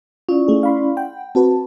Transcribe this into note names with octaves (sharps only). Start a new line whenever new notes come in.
C#4 E4 F4 D5
A3 G#4
F5 B5 C6
F#5 G5
C4 F#4 B4 A5